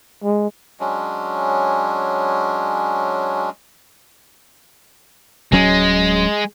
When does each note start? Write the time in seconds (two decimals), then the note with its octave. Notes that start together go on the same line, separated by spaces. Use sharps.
0.24 G#3
0.80 F#3 G#3 C#4 D4
5.53 D1 F#3 G#3 C#4